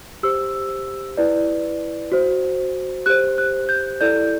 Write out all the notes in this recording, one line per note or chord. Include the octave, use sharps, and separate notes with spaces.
G4 C5 E6
E4 B4 D5
F#4 C5
G4 C5 F#6
F#6
G6
E4 A4 D5 G6